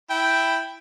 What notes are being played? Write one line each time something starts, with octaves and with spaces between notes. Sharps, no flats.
E4 G5